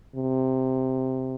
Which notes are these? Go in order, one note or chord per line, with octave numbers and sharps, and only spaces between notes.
C3